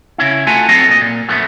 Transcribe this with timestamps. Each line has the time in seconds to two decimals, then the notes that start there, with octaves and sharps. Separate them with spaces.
0.18 C#3 C#4 E4
0.47 A3 F4 F#4 G#5
0.69 F#3 C4 F#4 A4 C#5 D#5
0.89 A#2 D#5
1.01 A#2
1.29 F#2 F3 A3 B3